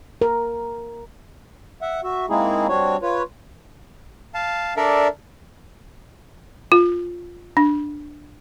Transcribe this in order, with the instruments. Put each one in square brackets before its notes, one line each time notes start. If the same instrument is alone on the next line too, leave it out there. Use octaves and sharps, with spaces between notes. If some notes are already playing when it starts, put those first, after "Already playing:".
[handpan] A#4
[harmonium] E5 F#5
F#4 E5
G#3 A#3 C4 D#4 E4 G#4
G3 C4 D4 F#4 C#5
F4 B4 C#5
[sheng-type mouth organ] F5 A5
D4 A4 A#4 D5 E5
[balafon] F4
D4